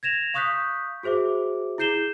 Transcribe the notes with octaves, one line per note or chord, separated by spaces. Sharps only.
G#6 A#6 E7 F7
F5 C#6 D#6 F#6 G6 B6
F#4 G#4 C5 E5 D6
E4 G#4 G6 C7 E7 G7